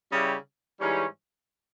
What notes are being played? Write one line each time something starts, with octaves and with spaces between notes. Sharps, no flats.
C#3 G3 C#4 E4 G4
G#2 E3 G3 C#4